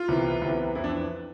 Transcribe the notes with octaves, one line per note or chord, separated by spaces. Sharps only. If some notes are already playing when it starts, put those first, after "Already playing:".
Already playing: F4
C2 C3 E3 B3
C2 C3 E3 B3
F2 E3 B3 E4
D4